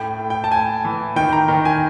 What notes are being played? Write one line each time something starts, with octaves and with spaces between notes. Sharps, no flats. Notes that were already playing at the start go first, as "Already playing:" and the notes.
Already playing: A2 G5
A2
G5
A5
A2 G#5
E3
D#3 G5
A#5
D#3 G5
G#5